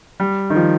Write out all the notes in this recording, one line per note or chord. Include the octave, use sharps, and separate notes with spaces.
G3
D#3
F3